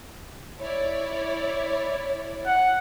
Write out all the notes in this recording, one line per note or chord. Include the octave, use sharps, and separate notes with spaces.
E4 C#5 D5
F#5